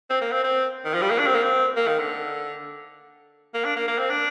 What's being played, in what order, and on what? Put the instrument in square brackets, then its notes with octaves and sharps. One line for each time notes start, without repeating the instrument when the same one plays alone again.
[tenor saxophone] C4
A#3
C4
C4
D#3
F3
G3
A#3
D4
C4
A#3
C4
A#3
D#3
D3
A#3
D4
A#3
A#3
C4
D4